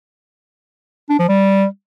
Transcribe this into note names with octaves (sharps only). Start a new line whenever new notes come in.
D4
F3
G3